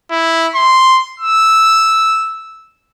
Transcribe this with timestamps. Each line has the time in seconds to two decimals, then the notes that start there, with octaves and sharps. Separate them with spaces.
0.11 E4
0.55 C6
1.20 E6